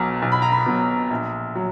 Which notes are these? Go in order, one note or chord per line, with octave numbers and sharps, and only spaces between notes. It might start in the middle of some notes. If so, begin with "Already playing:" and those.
Already playing: B1 B2 F#3 A#5
B1
B5
A#5
B5
B2 F#3
A#1
F#3